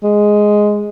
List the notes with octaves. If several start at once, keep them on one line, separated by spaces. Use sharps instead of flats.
G#3